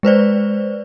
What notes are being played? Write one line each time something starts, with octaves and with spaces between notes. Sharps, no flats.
G#3 B4 C5 D5